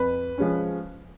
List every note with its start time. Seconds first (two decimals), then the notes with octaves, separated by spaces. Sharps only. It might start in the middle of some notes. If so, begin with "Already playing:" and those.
Already playing: F2 B4
0.38 F3 G#3 C#4